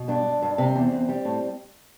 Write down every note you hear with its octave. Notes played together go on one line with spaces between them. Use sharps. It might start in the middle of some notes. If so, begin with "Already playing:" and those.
Already playing: B2
G2 D4
G2
G2
C3 C4
E2
E2
G3
A2